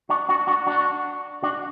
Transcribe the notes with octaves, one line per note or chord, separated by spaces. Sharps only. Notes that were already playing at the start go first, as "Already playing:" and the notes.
D4 F#4
D4 F#4
D4 F#4
D4 F#4
D4 F#4